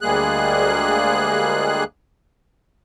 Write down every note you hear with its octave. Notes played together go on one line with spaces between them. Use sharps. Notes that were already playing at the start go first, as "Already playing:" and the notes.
D2 G3 G#3 A#3 G#4 F#6